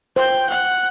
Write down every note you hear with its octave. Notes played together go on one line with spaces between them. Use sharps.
C5 G5
F#5